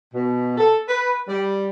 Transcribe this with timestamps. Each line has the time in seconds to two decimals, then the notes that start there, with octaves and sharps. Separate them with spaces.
0.13 B2
0.58 A4
0.87 B4
1.28 G3